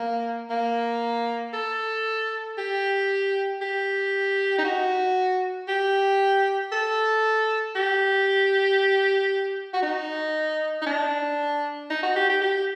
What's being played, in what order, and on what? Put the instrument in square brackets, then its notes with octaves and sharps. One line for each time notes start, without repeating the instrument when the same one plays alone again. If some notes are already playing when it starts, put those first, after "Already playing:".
Already playing: [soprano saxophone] A#3
A#3
A4
G4
G4
D#4
F#4
G4
A4
G4
F#4
D#4
D#4
D4
D#4
F#4
G4
G4
G4